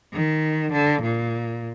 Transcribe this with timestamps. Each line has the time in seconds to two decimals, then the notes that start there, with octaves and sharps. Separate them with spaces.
0.13 D#3
0.73 D3
1.02 A#2